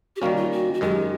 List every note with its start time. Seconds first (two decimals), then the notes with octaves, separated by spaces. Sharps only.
0.16 G4
0.21 D#3 G3 A#3 C#4 F#4
0.36 F4
0.52 F#4
0.74 F#4
0.81 F#2 D#3 G#3 G4